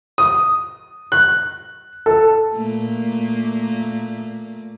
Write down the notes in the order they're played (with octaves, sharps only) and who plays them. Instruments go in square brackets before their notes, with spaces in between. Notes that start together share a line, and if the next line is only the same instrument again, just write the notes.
[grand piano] D#6
F#6
A4
[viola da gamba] A#2 A3 A#3